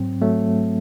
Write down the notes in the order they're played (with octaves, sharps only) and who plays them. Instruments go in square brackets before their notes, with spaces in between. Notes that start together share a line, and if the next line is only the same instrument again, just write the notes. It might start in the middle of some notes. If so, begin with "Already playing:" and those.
Already playing: [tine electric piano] G#2 F#3 C4
F#3 A3